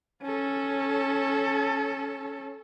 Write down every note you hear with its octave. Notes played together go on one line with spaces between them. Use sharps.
C#4 A4